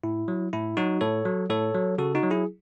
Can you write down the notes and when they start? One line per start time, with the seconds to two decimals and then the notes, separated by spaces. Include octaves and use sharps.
0.04 A2 E4
0.28 F#3
0.53 A2 E4
0.77 F#3 D#4 F#4
1.01 A2 A4 C#5
1.25 F#3
1.50 A2 A4 C#5
1.75 F#3
1.98 C#3 F#4 A4
2.15 D#4 F#4
2.23 F#3
2.31 E4 G#4